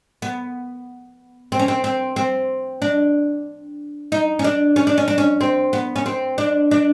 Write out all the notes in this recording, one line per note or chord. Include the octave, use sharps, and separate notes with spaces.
B3
C4
C#4
C4
C4
C4
D4
D#4
C#4
D4
C#4
D4
C#4
D4
C#4
C4
B3
C#4
C4
D4
D4